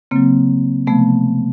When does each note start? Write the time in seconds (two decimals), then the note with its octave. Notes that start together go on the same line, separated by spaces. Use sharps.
0.11 C#3 F#3 A#3 C4
0.87 C3 F3 A3 B3